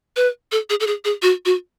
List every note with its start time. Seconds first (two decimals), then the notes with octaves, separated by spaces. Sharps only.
0.16 B4
0.52 A4
0.70 G#4
0.80 A4
0.87 G#4
1.05 G#4
1.22 F#4
1.45 F#4